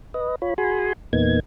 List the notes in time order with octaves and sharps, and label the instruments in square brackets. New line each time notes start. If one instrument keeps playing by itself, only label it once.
[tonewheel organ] B4 D#5
F4 C#5 B5
F#4 G#4 G#5 B5 C6
E2 A#2 A#3 B3 D#4 G#6